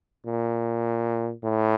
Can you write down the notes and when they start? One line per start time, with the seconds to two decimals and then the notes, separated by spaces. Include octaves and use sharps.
0.26 A#2
1.44 A2